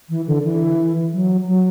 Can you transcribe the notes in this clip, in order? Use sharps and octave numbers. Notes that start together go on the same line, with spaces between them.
E3
D3
E3
F#3
F#3